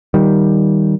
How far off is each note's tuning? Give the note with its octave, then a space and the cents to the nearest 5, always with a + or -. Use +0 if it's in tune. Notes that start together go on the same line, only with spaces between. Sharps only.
D#3 +10 G3 +0